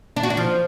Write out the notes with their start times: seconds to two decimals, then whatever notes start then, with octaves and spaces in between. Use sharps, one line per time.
0.17 D4
0.23 F#4
0.30 D4
0.37 F3